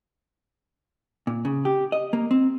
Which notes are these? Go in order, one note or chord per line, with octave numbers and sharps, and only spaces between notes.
A#2
C#3
G4
D#5
A#3
C4